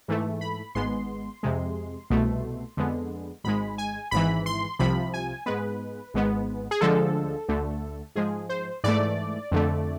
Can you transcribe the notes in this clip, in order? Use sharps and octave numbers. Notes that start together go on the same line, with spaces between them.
G#2 E3 A3
B5
G#1 G#2 G#3 B3 C6
F2 C3 G#3
C2 B2 A3
F2 D3 G#3 B3
G#1 G#2 G#3 B5
G#5
G#1 G#2 E3 B5
C6
C2 C3 F3 B5
G#5
G#2 G#3 B3 B4
G#1 G#2 G#3 B3
G#4
D2 D3 F3 G#3 A4
D2 D3 A3
G#2 F3 G#3 G#4
C5
G#2 E3 A3 D5
F2 D3 A3